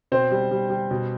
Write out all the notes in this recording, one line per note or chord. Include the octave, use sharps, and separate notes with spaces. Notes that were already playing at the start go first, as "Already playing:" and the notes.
B2 C4 C5
G3
G3
G3
B2